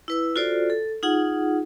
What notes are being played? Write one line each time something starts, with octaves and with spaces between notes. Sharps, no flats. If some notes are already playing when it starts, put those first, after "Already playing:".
E4 B4 E6
F4 F#4 A4 C5 D5
A4
D#4 F4 G#4 F#5